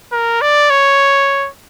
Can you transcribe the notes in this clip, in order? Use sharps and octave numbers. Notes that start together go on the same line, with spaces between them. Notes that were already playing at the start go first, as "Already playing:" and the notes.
A#4
D5
C#5